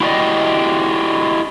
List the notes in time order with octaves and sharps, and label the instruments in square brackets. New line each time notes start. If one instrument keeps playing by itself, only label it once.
[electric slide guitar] E4 F#4 G4 B4 D5 D#5